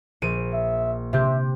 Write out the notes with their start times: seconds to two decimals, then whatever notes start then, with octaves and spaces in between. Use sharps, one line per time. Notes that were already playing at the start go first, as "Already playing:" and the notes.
0.22 A#1 D7 D#7
0.53 E5
1.13 C3 C4 G4 E5